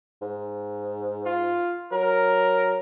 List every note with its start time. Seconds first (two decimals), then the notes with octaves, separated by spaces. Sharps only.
0.22 G#2
1.26 F4
1.92 F#3 A#4